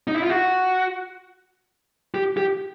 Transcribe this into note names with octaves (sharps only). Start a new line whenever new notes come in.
D#4
E4
F4
F#4
G4
G4